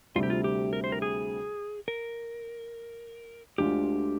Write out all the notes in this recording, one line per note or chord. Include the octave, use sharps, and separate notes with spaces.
D2 C3 G3 F4
G4
F4
G4
A#4
C5
A#4
G#4
A#4
D2 D3 G#3 D4 F4 G4